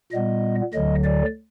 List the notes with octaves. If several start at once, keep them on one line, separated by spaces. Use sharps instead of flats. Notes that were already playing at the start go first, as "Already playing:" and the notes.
A#2 G3 B3 D#5
D2 D3 F#3 D#5
D5